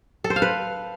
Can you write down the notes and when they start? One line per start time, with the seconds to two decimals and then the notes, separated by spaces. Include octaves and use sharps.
0.24 A4
0.30 C5
0.36 F5
0.42 B4